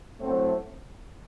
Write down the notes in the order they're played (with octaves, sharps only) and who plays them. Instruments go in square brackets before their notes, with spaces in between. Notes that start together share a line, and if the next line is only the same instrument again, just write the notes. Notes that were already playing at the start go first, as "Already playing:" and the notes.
[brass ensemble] A2 F#3 A3 C4